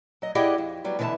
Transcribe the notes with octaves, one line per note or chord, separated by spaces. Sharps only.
F#3 D#5
E4 G4 G#4 D5 D#5 F#5
F2
F#3 G3 B3
B2 D3 E3 B4 E5 A5